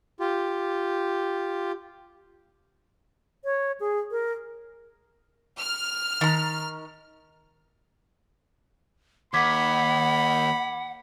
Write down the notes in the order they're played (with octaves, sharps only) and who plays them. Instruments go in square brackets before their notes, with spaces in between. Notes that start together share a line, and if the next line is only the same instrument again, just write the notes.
[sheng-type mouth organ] F4 G4
[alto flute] C#5
G#4
A#4
[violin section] F6
[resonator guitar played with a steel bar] D#3 A#5
[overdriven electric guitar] D#2 [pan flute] F#5 [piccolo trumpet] B5 [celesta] D6 G#6 B6